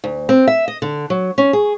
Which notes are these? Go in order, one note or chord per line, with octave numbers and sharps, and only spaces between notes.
D2
C4
E5
D#5
D3
F#3
C#4
G#4